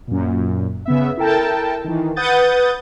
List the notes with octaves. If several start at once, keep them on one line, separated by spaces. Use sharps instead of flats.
F#2 A#2
C#3 B3 E5
E4 A4 A#4 G5 A5
D#3 E3
B4 F#5 D#6 G6 A6